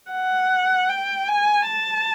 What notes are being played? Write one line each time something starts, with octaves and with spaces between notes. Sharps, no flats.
F#5
G5
G#5
A5